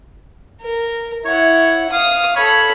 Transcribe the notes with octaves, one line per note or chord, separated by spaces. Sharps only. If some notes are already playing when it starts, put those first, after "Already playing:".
A#4
E4 C#5 F#5
F5 D#6
A4 C#5 B5